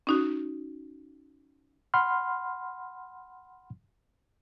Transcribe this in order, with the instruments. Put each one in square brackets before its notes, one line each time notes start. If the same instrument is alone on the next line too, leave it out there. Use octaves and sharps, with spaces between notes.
[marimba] C#4 D#4 F#4
[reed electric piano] F#5 B5 C6 F6